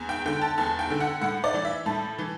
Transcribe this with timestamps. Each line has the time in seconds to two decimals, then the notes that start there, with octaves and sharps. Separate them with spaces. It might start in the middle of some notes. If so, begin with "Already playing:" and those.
Already playing: E2
0.09 G5
0.26 D3 G5
0.41 A5
0.58 E2 A5
0.79 G5
0.90 D3
1.00 F#5
1.21 A2 F#5
1.44 D5
1.54 E3
1.65 E5
1.86 A2 A5
2.18 E3